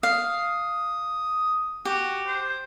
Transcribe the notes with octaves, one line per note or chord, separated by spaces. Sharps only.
F5 D#6
F#4 G4
C5